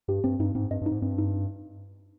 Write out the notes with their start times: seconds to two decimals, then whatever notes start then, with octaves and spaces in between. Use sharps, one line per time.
0.08 G2 G4
0.24 G2 C4
0.39 G2 D#4
0.55 G#2 C4
0.71 G2 D#5
0.81 G2
0.86 D#4
0.92 G#2
1.02 G2 C4
1.18 D#4